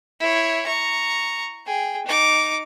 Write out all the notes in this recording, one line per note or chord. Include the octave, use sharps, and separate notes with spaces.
E4 C#5
A#5 C#6
G#4 G5
D#4 D6